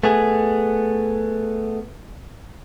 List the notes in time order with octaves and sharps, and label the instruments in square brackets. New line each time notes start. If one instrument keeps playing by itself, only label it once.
[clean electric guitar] A3 B3 G#4